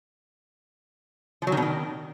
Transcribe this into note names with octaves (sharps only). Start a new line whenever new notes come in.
F3
F#3
D#3
B2
D#3